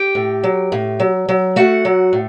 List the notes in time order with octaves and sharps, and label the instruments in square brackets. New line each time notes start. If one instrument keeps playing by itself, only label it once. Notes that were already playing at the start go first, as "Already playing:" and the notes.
Already playing: [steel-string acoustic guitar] G4 G5
A2
F#3
A2
F#3
F#3
A3 F#4 F#5
F#3
A2